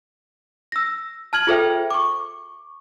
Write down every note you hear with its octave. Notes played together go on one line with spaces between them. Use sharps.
E6 A#6
A5 F6 G#6 F#7
F4 G#4 A4 C5 E5 G5
C#6 D6